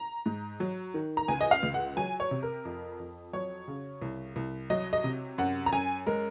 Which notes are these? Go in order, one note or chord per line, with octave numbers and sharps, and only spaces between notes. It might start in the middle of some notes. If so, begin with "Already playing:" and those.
Already playing: A#5
G#2
F#3
D#3
A#5
C#2 G#5
D#5
F5
C#2
F#5
F#3 G#5
C#5
C3
A#4
F2
F2
F#3 C#5
C#3
C2
C2
F#3 D#5
D#5
C3
F#2 F#5
A#5
F#2 G#5
G#3 A#4